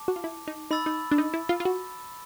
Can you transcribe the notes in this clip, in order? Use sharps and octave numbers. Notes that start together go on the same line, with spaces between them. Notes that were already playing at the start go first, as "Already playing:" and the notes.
Already playing: A5 D6
F#4
F4
E4
D#4
D#4 B5 E6 A6
D#4
D4
D#4
E4
F4
F4
F#4